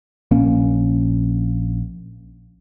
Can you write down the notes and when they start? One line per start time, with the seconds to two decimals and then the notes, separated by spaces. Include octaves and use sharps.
0.31 A#1 A#3 C#4